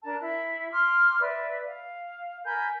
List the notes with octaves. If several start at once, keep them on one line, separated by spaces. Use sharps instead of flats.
D4 A#4 A5
E4
C6 D6 F6
B4 D5 E5
F5
A#4 G#5 B5 G6